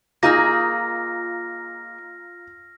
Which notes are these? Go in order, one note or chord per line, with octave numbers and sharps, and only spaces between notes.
A#3 D#4 F4 G#4 A#5 F6 A#6